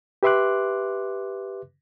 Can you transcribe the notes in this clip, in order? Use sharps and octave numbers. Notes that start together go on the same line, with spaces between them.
G4 B4 E5 C6 D6 F#6